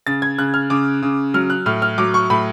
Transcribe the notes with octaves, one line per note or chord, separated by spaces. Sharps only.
C#3 A6
G#6
C#3 F#6
F6
C#3 D6
C#3
F#3 F6
F#6
A2 F6
F6
F#3 D6
C#6
A2 B5